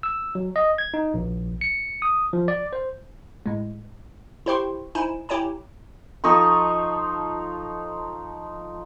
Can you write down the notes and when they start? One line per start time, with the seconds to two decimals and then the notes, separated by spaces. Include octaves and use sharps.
0.03 E6
0.35 F#3
0.56 D#5
0.78 G#6
0.94 D#4
1.14 A#1
1.61 C#7
2.02 D#6
2.33 F3
2.48 D5
2.73 C5
3.46 A2 G#3
4.46 E4 G4 C5 G5 C6 C#6
4.95 D#4 E4 C5 G#5 E7
5.29 E4 G4 C#5 G5 G#5 A#5
6.24 F3 D#4 A4 C#6